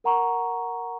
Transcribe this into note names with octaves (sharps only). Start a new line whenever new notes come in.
A#4 F#5 A#5 C#6